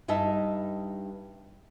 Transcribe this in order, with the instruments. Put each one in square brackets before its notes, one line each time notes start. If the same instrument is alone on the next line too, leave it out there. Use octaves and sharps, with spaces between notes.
[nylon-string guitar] G2 D#4 D#5 E5 A5